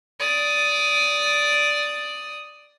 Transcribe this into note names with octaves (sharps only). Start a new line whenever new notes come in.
D5 D#6